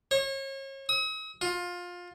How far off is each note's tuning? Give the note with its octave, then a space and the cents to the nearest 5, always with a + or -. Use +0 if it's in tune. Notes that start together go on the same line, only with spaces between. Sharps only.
C#5 -35
D#6 +45
F4 +20